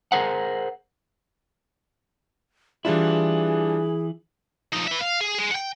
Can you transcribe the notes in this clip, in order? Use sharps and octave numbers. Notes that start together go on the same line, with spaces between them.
G#4 A#4 C5 F#5
E3 G3 D4 E4 F4 G#4
F3 D#4
B4 E5
F5
G#4
G#3
F#5 G5